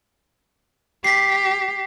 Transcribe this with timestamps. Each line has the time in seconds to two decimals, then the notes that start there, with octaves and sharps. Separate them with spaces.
1.04 G4 B6 C7